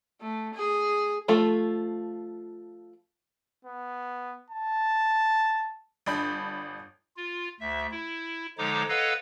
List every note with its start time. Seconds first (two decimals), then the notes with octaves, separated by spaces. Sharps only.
0.21 A3
0.54 G#4
1.28 F3 A3 F4 A4
3.65 B3
4.50 A5
6.06 G1 D4 B5 G6
7.17 F4
7.60 D2 E5
7.91 E4
8.58 D3 F3 G#3 D#4 C#5 D6
8.89 A4 B4 C#5 D#5 F5 F#5